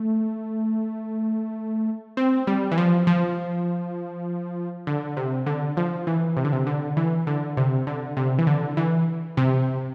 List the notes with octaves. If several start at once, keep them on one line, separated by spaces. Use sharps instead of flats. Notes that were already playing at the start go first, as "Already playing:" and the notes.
Already playing: A3
C4
G3
E3
F3
F3
D3
C3
D3
F3
E3
C3
D3
C3
D3
E3
D3
C3
D3
C3
E3
D3
E3
C3